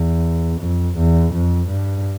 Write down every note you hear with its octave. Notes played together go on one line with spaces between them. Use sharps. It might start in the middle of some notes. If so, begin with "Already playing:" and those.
Already playing: E2
F2
E2
F2
G2